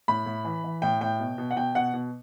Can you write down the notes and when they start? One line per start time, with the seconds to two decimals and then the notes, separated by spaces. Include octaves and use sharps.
0.08 A2 B5
0.26 A2
0.45 E3
0.64 E3
0.82 A2 G5
1.01 A2 G5
1.20 B2
1.38 B2
1.51 F#5
1.56 B2 G5
1.75 B2 F#5
1.94 B2